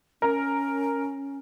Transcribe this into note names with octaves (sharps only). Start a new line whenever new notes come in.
C#4 A#4